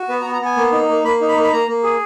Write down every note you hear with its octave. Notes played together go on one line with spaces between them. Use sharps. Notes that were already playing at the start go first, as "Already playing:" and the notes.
Already playing: F#4
B3 B4
A#5
B3
A#5
B3 G#5
A#3
D#4
A#3
A#3 B5
D#4
B5
A#3
B5
A#3 A#5
A#3
G#4